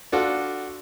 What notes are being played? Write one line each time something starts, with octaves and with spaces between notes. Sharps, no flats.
D4 F4 F#4 A4